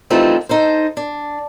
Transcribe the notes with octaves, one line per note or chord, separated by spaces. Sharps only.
E3 F3 G3 A3 C4 D#4
D#4 A4 C5
D4